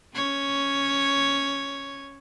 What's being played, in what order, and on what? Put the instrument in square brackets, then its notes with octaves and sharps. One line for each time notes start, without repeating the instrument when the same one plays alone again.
[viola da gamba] C#4 C#5